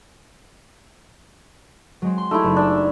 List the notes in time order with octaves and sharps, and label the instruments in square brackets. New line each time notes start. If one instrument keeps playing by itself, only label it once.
[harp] F#3 G#3 C4
C6
[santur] A3 E4 [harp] D#4 G4 G#4
[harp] F#1
[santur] D4 E6